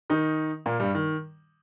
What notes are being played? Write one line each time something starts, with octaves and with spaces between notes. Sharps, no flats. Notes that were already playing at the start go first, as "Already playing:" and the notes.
D#3 D#4
A#2 A#3
G2 G3
D#3